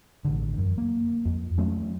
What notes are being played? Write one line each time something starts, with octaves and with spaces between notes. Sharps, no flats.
A1 D3
F#2
A#3
F2
F#3 A3 C#4